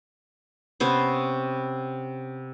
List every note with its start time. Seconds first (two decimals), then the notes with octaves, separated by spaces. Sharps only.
0.80 C3 B3 C#4 C5